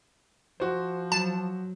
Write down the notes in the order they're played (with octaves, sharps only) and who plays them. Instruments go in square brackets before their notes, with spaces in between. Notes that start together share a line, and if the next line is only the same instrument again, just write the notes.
[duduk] F3 [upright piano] F#4 C5
[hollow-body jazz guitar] F#3 [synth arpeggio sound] A5